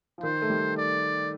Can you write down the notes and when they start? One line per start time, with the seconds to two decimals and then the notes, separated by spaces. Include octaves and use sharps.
0.18 F3
0.23 D#3 C5
0.42 A3
0.50 G3
0.77 D5